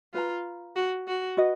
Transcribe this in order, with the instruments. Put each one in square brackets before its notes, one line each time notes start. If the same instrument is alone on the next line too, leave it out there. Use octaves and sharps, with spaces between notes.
[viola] F4 [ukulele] B4 F5 A#5
[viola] F#4
F#4
[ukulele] F#4 B4 D#5